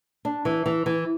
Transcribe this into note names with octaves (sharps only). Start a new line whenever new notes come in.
D4
E3
E3
E3